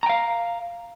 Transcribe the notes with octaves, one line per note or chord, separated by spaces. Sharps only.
F5 G5 A#5